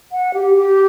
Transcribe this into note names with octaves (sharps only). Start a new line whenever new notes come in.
F#5
G4
G4